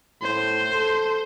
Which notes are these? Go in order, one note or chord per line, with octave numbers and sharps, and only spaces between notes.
A2 C5
A4